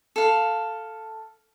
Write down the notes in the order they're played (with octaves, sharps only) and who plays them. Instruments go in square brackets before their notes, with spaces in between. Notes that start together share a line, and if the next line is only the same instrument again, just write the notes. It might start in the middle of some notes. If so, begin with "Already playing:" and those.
[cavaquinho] A4 F5